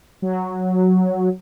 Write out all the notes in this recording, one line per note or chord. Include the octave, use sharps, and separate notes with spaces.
F#3